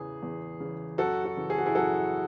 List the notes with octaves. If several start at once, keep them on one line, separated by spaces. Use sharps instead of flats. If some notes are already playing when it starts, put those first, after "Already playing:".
Already playing: E2 C#3 E3 G#4
E2
C#3 E3
F#2 F#4 A4
F#4
C#3 E3
G#4
F#4
E4 G#4
F#2 F#4 A4